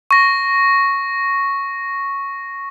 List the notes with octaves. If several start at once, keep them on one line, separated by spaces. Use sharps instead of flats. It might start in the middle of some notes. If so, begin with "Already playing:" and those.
C#6 A#6